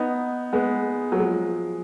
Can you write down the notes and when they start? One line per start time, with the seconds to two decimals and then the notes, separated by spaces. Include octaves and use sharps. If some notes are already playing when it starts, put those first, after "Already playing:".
Already playing: B3 D#4
0.53 G#3 B3
1.12 F#3
1.19 F3 G#3